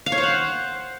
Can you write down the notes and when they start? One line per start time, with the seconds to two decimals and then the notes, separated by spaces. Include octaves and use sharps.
0.06 F5
0.12 C#5
0.18 C5
0.23 F#5